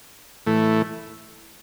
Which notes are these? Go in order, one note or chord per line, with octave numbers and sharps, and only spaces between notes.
A2 E3 A3